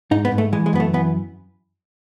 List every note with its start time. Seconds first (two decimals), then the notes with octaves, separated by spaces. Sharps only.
0.11 G#2 D#4
0.25 B3
0.32 G#2
0.38 A3
0.53 E3 G#3
0.66 G#3
0.73 F#2 B3
0.80 A3
0.94 E3 B3